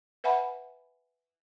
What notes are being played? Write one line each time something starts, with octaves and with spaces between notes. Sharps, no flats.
B4 E5 F#5 G#5 B5